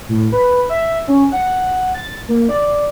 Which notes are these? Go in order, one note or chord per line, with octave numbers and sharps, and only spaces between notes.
A2
B4
E5
C#4
F#5
A6
A#3
D5